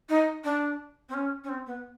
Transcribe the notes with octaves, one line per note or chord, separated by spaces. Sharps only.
D#4
D4
C4
C#4
C#4
C4
B3